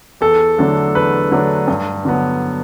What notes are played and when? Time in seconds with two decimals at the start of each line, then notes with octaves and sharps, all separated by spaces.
0.21 E2 A4
0.58 D3 F#3 A3 D4
0.95 E2 B4
1.32 D3 F#3 A3 D4
1.67 G2
2.05 D3 F#3 B3